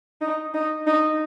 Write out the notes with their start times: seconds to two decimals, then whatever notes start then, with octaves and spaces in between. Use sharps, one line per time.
0.21 D#4
0.54 D#4
0.87 D#4